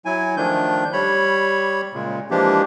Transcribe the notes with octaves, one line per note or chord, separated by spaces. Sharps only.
F#3 E4 G#5
D#3 F3 A3 D4 G6
G3 C#5 B5
A#2 C#3 G#3
E3 F3 G#3 A#3 D4 G4